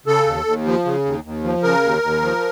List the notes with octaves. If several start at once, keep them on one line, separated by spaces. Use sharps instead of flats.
C#3 A4
D#2
D#2
F3
C#3
D#2
D#2
F3
C#3 A#4
D#2
D#2
F3